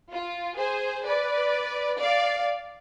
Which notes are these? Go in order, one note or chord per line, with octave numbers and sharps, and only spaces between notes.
F4
G#4 C5
B4 D5
D5 F5